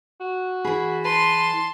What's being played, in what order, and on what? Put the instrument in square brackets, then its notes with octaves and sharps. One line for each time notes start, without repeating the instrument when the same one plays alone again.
[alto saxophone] F#4
[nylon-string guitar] E3 G#4 [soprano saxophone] B5
[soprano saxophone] B4 [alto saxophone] A5 [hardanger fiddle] C6